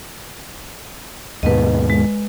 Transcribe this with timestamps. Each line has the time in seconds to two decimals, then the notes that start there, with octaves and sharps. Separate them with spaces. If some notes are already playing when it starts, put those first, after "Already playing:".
1.43 D#2 G#2 B2 B4 D#5
1.90 G#3